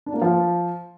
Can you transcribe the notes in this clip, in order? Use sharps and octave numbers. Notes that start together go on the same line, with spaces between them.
D4
A#3
F3